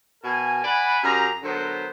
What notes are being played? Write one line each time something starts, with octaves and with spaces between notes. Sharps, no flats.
B2 A#4 G#5
D5 F#5 G#5 B5
F#2 G4 G#4 A#5
D3 F#3 B3 A#4 C5